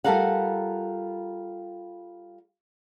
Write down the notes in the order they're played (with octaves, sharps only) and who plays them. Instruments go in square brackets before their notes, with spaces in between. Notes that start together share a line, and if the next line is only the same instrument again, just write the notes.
[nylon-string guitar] G3 F4 A4 A#4 F5 F#5